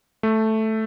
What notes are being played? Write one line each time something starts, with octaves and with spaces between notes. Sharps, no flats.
A3